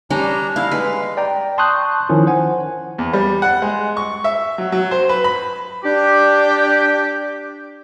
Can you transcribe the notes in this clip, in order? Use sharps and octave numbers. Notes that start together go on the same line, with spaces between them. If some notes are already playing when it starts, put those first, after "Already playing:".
G3 C#4 D4 A#5
E4 F5
G#3 B4
D5 G5 A#5
A5 C6 C#6 D#6 F#6 G6
D#3 F3 C#4 E4
C5 F#5 G#5
E2
G3
F#5
G#3
C#6
E5
F#3
F#3
C5
B4
B5
D4 G4